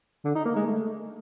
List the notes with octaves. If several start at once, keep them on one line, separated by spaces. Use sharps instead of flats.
D3
D#4
A#3
G#3
A3